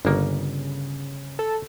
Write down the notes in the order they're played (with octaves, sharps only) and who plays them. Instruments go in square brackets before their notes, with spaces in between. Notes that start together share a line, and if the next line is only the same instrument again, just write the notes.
[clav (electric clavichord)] G1 A#3 [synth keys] C#3
[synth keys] A4